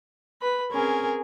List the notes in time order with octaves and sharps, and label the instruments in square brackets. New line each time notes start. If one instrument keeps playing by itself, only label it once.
[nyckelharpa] B4 B5
[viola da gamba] C4 G#4 A#4 [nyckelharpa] C#4